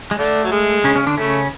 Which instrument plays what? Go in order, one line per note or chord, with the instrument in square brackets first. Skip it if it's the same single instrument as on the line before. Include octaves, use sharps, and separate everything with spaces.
[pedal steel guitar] G#3
[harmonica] D3 D4 [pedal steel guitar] A3
[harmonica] F#3
G#3
[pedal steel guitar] C#3 C#4
C#3 C#4
D3 D4
[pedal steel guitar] C#3 C#4 [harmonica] A3